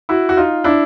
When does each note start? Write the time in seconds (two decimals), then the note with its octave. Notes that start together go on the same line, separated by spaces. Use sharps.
0.09 E4 F#4
0.29 F#4
0.37 D#4 F4
0.64 D4 E4